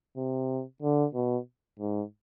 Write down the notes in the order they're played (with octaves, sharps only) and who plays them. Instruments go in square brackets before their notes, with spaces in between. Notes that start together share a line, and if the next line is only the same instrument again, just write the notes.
[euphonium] C3
D3
B2
G#2